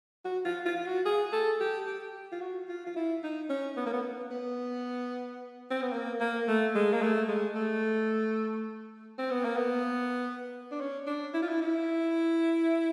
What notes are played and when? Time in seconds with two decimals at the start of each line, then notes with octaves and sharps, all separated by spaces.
0.25 F#4
0.45 F4
0.65 F4
0.76 F4
0.86 F#4
1.05 G#4
1.33 A4
1.60 G4
1.87 G4
2.32 F4
2.41 F#4
2.69 F4
2.86 F4
2.96 E4
3.23 D#4
3.50 C#4
3.77 B3
3.86 A#3
3.93 B3
4.31 B3
5.70 C4
5.82 B3
5.93 A#3
6.20 A#3
6.48 A3
6.75 G#3
6.93 A#3
7.02 A3
7.28 G#3
7.55 A3
9.18 C4
9.31 B3
9.45 A#3
9.57 B3
10.71 D4
10.81 C#4
11.07 D4
11.34 E4
11.42 F4
11.49 E4
11.62 E4